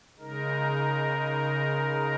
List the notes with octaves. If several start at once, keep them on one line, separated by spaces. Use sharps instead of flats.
C#3 G#3 D#4 A#4